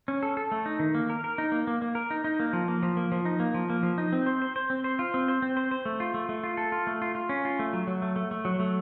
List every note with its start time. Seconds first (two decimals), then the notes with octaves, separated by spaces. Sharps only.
0.08 C#4
0.23 A4
0.37 A4
0.52 A3
0.66 D#4
0.80 D#3
0.95 A#3
1.10 A#4
1.24 A#4
1.38 D#4
1.52 A#3
1.67 A#3
1.82 A#3
1.95 A#4
2.11 D#4
2.24 D#4
2.40 A#3
2.53 F3
2.68 A#3
2.83 F3
2.97 A#3
3.12 F3
3.25 D#4
3.40 A#3
3.54 F3
3.70 A#3
3.83 F3
3.98 D#4
4.13 C4
4.26 C5
4.42 C5
4.56 C5
4.70 C4
4.84 C5
4.99 F4
5.14 C4
5.28 C5
5.42 C4
5.57 C5
5.71 C5
5.85 A3
6.00 F4
6.14 A3
6.29 A3
6.44 F4
6.57 A4
6.72 F4
6.87 A3
7.02 F4
7.15 F4
7.29 C#4
7.45 F4
7.59 A3
7.73 F#3
7.87 F#3
8.02 A3
8.16 A3
8.31 A3
8.45 F#3
8.60 A3